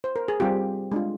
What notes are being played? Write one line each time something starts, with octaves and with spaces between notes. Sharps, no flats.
C5
A#4
G#4
G3 C4 F4 G4
G#3 D4 F4